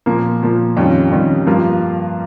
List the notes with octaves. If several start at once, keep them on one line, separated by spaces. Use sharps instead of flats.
A#2 F3 A#3
A#2 F3 A#3
F2 D#3 G3 C#4 F4
F2 D#3 G3 C#4 F4
G2 F3 A#3 F4